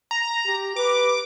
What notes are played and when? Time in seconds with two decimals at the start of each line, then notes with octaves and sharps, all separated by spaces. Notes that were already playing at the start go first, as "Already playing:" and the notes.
0.11 A#5
0.46 G4
0.76 B4 D6